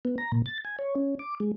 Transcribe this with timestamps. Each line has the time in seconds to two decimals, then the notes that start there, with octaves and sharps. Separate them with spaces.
0.05 B3
0.18 A#5
0.32 A#2
0.46 A6
0.65 G#5
0.79 C#5
0.95 C#4
1.19 D6
1.40 G#3